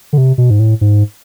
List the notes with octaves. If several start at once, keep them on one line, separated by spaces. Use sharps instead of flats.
D3
C3
B2
G#2
A2
G#2